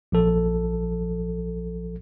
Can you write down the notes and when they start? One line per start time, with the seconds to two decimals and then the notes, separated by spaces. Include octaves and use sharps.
0.12 A#1 F3 A4